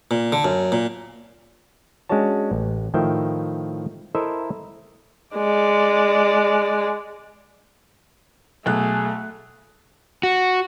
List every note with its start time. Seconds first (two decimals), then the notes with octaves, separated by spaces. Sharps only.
0.11 A#2
0.32 D3
0.44 F#2
0.72 A#2
2.09 G#3 C#4 D4 F#4 C#5 A5
2.51 A1
2.94 A2 D#3 F3 E5 G5
4.15 E4 A4 A#4 C5 D#5 E5
5.37 G#3 D5
8.66 B1 A3 G#4 F#6
10.23 F#4